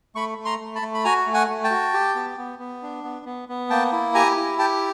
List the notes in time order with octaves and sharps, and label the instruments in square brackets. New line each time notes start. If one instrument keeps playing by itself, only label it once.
[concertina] A3 B5 C#6
A3
A#5 C6
A3
A5 B5
A3
B5
F#4 G#5 A#5
A3
F#5 G#5
A3
G5 A5
F#4
G4
B3
B3
B3
D4
B3
B3
B3
A#3 G5 A5
E4
G4 G#5 A#5
E4
G4 G5 A5